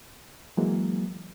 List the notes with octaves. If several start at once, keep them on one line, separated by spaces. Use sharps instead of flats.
E3 F#3 G#3 A#3